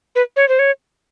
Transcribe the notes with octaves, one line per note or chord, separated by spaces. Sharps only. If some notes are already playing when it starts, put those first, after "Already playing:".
B4
C#5
C5
C#5